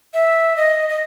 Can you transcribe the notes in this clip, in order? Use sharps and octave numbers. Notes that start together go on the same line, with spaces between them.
E5
D#5
D#5